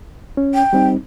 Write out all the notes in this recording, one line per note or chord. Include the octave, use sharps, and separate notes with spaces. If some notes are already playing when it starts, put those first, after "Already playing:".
C#4
G5
G3 C4 D#4